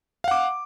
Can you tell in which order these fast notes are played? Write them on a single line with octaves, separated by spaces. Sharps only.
F5 F#5 D6